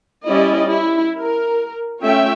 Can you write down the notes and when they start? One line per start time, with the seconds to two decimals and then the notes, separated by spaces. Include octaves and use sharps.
0.28 G3 C#4 E4 D5 D#5
0.68 E4
1.19 A#4
2.00 A3 C#4 F4 C#5 E5 G5